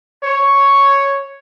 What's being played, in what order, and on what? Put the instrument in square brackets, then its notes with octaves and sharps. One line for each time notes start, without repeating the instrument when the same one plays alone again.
[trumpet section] C#5